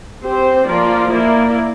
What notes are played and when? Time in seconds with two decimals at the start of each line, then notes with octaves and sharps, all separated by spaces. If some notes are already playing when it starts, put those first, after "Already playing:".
0.23 C4 G4 C5
0.66 F3 A#3 F4 A#4 D5
1.10 A#3 E4 A#4 D5